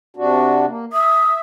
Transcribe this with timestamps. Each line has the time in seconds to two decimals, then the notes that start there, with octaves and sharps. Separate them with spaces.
0.17 C3 D4 F#4
0.66 A#3
0.93 E5 D#6